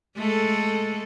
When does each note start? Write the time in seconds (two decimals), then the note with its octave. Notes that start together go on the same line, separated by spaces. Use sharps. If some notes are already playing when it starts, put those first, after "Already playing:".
0.17 G#3 A3 A4